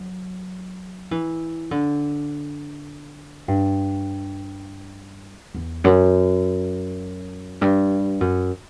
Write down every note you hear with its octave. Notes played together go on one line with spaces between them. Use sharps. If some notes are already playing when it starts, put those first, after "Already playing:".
Already playing: F#3
E3
D3
G2
E2
F#2
G2
F#2